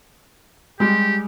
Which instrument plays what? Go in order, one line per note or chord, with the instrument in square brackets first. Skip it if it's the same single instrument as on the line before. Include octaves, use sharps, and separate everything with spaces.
[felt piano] G3 G#3 [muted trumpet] G4